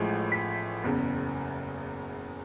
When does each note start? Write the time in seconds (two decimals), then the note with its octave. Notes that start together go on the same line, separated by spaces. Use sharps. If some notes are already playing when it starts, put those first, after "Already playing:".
Already playing: A1 A2 F3 G#3
0.32 B6
0.83 F#1 E2 C#3